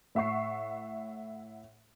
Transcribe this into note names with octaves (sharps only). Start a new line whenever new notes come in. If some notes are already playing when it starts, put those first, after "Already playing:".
A2 E5 F#5 C#6 C7